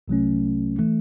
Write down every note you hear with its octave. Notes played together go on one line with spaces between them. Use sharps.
C2 C3 F#3 A3 C#4
E3 A3